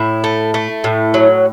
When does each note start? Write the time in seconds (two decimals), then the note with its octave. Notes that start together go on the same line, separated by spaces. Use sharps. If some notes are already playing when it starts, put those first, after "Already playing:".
Already playing: A2 E4
0.24 A3
0.54 A3
0.84 A2
1.14 F#3